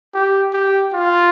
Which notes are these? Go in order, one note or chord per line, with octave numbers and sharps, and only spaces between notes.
G4
G4
F4